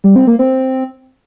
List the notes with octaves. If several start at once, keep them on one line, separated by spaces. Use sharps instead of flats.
G3
C4
A#3
C4